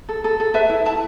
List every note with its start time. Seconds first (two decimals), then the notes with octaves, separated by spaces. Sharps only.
0.09 A4
0.24 A4
0.40 A4
0.54 B4 E5
0.70 E4
0.86 E4 A5